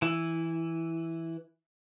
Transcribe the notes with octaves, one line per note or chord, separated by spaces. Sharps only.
E3 E4